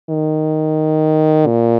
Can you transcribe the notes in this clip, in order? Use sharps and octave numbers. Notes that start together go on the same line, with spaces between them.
D#3
A#2